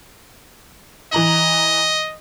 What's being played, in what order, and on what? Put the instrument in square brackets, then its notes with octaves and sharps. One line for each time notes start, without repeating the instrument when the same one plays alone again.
[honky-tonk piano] E3 A#5 F#7 [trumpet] D#5